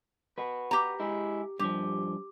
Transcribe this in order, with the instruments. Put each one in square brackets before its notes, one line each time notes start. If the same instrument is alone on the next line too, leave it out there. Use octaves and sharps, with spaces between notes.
[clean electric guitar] F#4 B4
[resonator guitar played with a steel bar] G4 A#5
[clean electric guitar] G#3 E4
[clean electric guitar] G2 F3 [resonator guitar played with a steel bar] G4